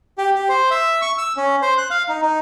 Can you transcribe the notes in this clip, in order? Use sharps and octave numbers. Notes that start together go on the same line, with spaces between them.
G4
G4
C5
E5
C#6
E6
C#4
C5
F#6
F5
D#4
D#4